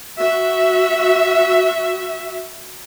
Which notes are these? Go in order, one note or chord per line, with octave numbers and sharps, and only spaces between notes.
F#4 E5